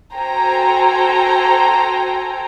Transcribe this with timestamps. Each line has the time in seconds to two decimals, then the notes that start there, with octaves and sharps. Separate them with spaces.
0.14 F#4 A4 C5 G5 G#5 A#5